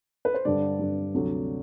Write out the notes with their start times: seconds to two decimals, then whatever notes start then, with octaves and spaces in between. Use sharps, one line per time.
0.25 B4
0.34 C5
0.45 G2 D3 G3 D5
0.79 G2 D3 G3
1.14 D2 C3 F#3